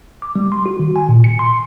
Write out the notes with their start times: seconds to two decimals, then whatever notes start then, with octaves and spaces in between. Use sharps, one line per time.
0.22 D6
0.36 G3
0.52 C6
0.66 F#4
0.79 D#3
0.96 G#5
1.09 A#2
1.24 C#7
1.39 C6